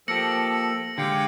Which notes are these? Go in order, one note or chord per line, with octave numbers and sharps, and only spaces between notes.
F3 A#3 G4 A4 A#6 C#7 F#7
D3 G#3 G4 F5 G5